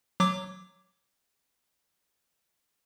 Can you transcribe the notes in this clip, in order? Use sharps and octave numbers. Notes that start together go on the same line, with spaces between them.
F#3 D6